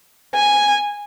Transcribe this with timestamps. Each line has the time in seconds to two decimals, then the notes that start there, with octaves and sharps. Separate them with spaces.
0.34 G#5